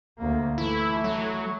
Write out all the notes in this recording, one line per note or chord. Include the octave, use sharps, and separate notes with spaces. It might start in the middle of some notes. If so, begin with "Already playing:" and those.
D2 A#3
E3 A3 E4
F#3